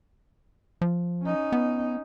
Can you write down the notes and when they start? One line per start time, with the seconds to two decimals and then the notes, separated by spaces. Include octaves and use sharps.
0.81 F3
1.23 C#4 D#4
1.52 B3